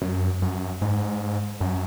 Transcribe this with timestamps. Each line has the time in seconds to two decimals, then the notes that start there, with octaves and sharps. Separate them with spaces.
0.02 F#2
0.42 F#2
0.81 G#2
1.61 F#2